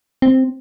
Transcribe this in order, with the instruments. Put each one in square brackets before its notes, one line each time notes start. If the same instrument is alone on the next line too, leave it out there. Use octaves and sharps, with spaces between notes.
[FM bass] C4